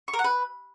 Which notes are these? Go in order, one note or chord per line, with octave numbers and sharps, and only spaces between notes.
C#6
A#4
F#5
B4